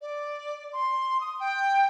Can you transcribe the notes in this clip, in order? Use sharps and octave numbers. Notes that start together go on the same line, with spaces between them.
D5
C6
D#6
G5